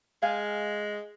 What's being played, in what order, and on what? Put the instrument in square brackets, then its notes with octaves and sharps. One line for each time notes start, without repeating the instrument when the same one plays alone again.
[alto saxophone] G#3 [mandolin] F5 G5 G#5